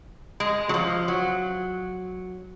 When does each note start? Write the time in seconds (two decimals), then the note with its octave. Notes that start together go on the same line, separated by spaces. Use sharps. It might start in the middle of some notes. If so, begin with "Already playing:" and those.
0.40 G#3
0.69 F#3
0.74 F3
1.08 F#3